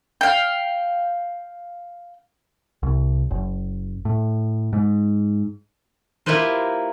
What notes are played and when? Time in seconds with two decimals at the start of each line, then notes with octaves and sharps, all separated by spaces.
0.21 F5 G5
2.83 C2
3.31 F#1
4.05 A2
4.73 G#2
6.26 A#3 E4 F4 G4 B4 C5